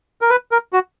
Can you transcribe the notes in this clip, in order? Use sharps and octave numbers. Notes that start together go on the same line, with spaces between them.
A#4
B4
A#4
F#4